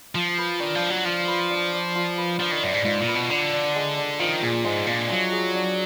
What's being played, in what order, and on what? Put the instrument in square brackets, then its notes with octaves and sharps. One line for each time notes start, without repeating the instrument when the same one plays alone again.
[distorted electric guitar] F3 [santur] F4
[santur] B4
[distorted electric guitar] D#3 [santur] D4
[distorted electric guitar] F3
[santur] D5
[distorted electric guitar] F#3
[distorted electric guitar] F3 [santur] F4
[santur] B4
D4
D5
F4
B4
[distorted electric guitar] F3 [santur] D4
[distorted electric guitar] D#3
[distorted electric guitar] F#2 [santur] D4
[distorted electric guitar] G#2
[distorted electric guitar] G#2 [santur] F4
[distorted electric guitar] A#2
[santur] B4
[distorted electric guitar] B2
[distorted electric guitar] D3 [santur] D4
[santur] D4
G#3
D4
[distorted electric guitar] D#3 [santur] F3
[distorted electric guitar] A#2 [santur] G#4
[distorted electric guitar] G#2 [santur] G#3
[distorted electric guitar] A#2 [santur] D4
[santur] F3 [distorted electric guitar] F#3
[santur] G#4
D4